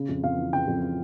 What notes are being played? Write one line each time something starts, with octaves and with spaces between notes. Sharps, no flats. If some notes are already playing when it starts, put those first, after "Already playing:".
Already playing: C#3
F2
F2 F5
E3
C#3 G5
F2